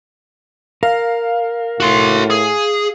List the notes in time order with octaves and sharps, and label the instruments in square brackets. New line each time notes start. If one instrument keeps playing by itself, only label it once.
[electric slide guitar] A#4 [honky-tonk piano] F5
[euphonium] A2 [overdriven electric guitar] F#4 C6
[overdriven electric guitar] G#4